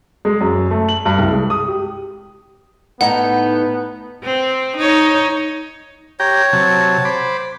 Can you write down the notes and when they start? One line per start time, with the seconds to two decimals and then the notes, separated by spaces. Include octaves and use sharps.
0.25 G#3
0.41 F#2
0.71 A3
0.89 F#7
1.05 G2
1.19 C2
1.31 G#3
1.50 D#6
1.68 G4
3.01 A2 B3 D#4 F#5
4.24 C4
4.77 D#4 C#5
6.20 G4 C#5 G5 A#5
6.53 C3 F#3 A5
7.05 C5 B5 D6